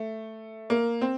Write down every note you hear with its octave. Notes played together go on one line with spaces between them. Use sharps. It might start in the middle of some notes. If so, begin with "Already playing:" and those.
Already playing: A3
A#3
C4